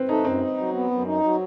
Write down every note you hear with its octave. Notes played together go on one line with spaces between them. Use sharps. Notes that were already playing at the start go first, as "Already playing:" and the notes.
Already playing: C4 B4
A3 D#4
F#2 C4
D#4
F#3
B3
F#2
D#4
F#3